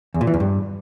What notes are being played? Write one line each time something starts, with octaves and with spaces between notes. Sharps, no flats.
E2
A#2
E3
E2
G2